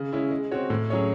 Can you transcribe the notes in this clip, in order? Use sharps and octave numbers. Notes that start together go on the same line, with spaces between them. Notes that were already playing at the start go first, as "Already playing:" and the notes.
Already playing: C#3
G#3 C#4 E4
G#3
C4 F#4 C#5
A2
F#3 C#4 G#4 C#5